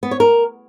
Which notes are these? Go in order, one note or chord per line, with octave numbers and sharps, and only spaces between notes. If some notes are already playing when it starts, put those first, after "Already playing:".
B3
C#5
A#4